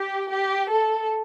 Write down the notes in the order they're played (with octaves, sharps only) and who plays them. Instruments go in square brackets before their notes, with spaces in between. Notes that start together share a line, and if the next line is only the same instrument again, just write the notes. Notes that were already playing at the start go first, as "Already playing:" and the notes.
Already playing: [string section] G4
G4
A4